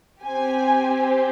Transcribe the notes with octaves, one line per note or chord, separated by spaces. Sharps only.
C4 G4 G#5